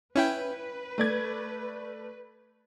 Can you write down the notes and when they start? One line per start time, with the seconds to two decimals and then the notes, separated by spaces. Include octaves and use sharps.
0.15 C#4 E4 B4 G5
0.98 A3 D5 G#6